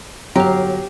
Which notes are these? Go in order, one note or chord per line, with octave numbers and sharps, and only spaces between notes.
G1 F#3 G4 F5 A#5